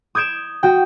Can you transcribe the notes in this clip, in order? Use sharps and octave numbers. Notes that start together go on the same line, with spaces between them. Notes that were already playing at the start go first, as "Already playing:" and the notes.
D#6 G6 G#6 D7 E7
F#4 G5